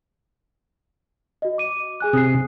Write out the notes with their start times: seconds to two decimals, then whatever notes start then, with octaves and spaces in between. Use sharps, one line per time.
1.42 F#4 D#5
1.58 D6 D#7
2.00 G#4 G#5 F#6
2.13 C3 D#6 C7